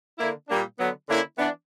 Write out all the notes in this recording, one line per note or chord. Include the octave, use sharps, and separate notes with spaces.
D3 A#3 E4
A#2 G3 A#3 D4
D3 F#3 B3
D3 A#3 C#4 E4
E3 B3 D4